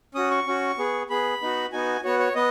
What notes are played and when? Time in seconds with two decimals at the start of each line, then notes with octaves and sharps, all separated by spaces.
0.14 C#4 F#4 D#6
0.31 C#6
0.46 C#4 F#4
0.78 B3 G#4
1.10 B3 G#4 B5
1.41 B3 D#4 F#4
1.72 B3 D#4 F#4 G#5
2.04 B3 F#4 C#5
2.19 C#5
2.35 B3 D#5